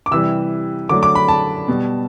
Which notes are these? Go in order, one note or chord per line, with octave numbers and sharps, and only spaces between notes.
D6
C3 E3 G3 E6
D3 F#3 A3 D6
D6
B5
A5
B2 G3